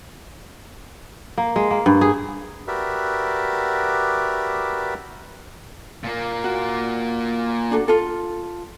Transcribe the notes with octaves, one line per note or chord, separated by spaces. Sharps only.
A#3
G#3
A#3
G2
G#4
F#4 G4 A#4 B4 D5 E5
A#2 A#3
F#4
D4 F#4 A4
F4 A4